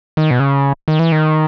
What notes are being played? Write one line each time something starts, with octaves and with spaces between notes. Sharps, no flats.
D#3
B2
C#3
D#3
E3
D#3